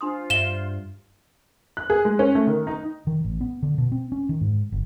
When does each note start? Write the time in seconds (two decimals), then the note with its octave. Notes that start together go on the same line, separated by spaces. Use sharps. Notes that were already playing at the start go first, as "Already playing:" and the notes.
0.01 D4 F4 C5 C6 D#6
0.30 G2 E5 F5 E7 G7
1.77 F#6
1.90 G#4
2.05 G#3
2.19 C#4
2.35 A3
2.47 D#3
2.67 D#4
3.07 D#3
3.24 A1
3.41 B3
3.62 D3
3.78 B2
3.92 C4
4.12 C#4
4.29 D#3
4.41 G#2
4.72 G1